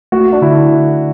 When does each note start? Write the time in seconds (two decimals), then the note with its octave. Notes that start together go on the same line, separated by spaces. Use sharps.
0.12 A3 F#4
0.32 D4
0.42 D3 E4
0.72 D3